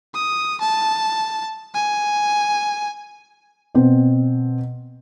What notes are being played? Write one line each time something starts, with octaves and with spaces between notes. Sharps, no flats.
D#6
A5
G#5
B2 C4